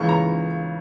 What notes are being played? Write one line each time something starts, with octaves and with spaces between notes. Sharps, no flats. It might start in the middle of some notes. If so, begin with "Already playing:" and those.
Already playing: C#2 C#3 E3 A#3 C#6
A#5